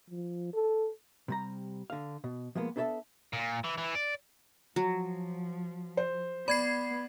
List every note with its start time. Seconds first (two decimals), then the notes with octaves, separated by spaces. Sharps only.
0.10 F3
0.53 A4
1.28 C3 G3 A#5
1.90 D3 F5
2.24 B2
2.55 F3 G#3 A#3 B3
2.76 B3 D4 A4 C#5 E5 A5
3.33 A#2
3.64 E3
3.78 E3
3.95 D5
4.76 F3 F#3
5.97 C5
6.48 B3 D5 B5 G#6 C7